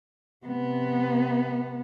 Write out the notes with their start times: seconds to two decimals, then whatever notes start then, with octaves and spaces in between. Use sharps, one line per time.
0.46 C3 B3